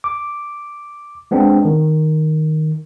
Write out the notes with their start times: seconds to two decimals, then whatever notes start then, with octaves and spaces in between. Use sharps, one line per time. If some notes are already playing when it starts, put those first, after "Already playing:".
0.04 D6
1.31 G#3 B3 C4 D4
1.65 D#3